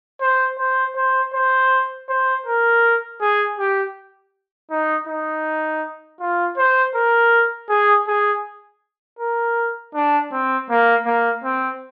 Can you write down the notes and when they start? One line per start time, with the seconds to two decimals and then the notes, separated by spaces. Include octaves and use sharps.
0.21 C5
0.59 C5
0.97 C5
1.34 C5
2.09 C5
2.46 A#4
3.21 G#4
3.59 G4
4.71 D#4
5.08 D#4
6.20 F4
6.58 C5
6.95 A#4
7.70 G#4
8.08 G#4
9.19 A#4
9.95 D4
10.32 C4
10.70 A#3
11.06 A#3
11.44 C4